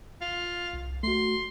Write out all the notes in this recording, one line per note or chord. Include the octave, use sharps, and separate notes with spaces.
F4
C2
A3 F#4 C6